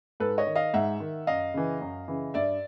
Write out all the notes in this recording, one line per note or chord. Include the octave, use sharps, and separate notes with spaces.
G#2 A4 B4
C#5 D#5
D#3
D#5 F5
G#2 E5 F#5
D#3
F#2 D#5 F5
C#3 E3
F#2
C#3 E3
G2 D5 E5